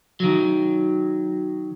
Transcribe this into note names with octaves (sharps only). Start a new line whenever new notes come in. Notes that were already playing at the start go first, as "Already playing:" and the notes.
D#3 F#3